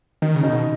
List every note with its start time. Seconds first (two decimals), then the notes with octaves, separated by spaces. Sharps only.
0.22 D#3 D#4
0.35 C#3
0.43 D#4
0.49 B2